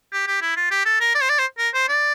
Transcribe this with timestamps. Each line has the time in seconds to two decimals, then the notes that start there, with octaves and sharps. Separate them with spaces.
0.12 G4
0.27 G4
0.42 E4
0.56 F4
0.71 G4
0.86 A4
1.00 A#4
1.15 D5
1.22 C5
1.29 D5
1.39 C5
1.58 A#4
1.74 C5
1.89 D5